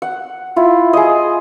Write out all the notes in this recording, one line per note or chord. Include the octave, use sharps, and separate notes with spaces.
F#5
E4 F4
G#4 D#5